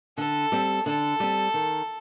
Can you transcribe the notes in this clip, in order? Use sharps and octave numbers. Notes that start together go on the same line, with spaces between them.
D3 A4
G3 C4
D3 A4
G3 C4
D#3